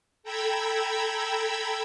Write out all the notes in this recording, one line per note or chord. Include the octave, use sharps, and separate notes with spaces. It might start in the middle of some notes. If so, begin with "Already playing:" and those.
A4 G5 A#5 B5 E6 G#6